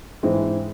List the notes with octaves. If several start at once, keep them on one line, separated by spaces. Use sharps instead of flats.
G#2 E3 G#3 C4